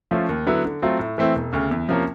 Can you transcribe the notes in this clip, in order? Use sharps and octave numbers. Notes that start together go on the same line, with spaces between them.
F3 A3 C#4 F4
D#2
D3 F#3 B3 E4
D3
F#3 A3 C4 F4
A2
E3 A3 C4 E4
E1
D2 C#3
E2
C3 F3 A#3 C#4